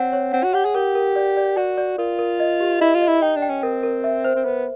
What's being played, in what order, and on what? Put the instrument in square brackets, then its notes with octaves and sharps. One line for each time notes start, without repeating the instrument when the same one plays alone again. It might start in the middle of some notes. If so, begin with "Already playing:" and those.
Already playing: [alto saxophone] C4 [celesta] C#5 F#5
[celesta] C#5
[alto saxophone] C4 [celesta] F#5
[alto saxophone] F#4
[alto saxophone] G4 [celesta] F#5
[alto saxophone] G#4
[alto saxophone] G4 [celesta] A#4
[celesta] A#4
D5
D5
[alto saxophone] F#4 [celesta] D5
[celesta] D5
[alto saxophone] F4 [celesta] A#4
[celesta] A#4
D#5
G4
[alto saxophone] E4 [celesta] D#5
[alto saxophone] F4
[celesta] D#5
[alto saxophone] E4
[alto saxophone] D#4 [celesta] G5
[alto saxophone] D4
[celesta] G5
[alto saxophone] C#4
[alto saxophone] C4 [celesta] A#4
[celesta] A#4
E5
C5
[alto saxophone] C4
[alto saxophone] B3 [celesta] C5